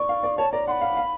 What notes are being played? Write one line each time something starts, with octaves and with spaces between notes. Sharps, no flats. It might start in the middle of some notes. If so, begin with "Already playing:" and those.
Already playing: D5 C#6
F5
D5
C#5 A5
D5 A#5
F#5 C6
B5
F5
F5